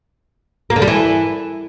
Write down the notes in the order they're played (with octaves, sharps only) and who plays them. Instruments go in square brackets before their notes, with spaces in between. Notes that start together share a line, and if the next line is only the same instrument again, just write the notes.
[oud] A#3
D3
G3
E3